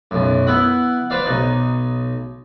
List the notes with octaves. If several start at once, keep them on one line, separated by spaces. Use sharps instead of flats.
B1 F#2
B3 E4 F#5
B4 C5 D5 F5
B1 D#4